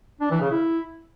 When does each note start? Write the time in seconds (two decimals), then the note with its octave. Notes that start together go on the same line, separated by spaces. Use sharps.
0.21 D4
0.31 E3
0.41 C#3
0.51 E4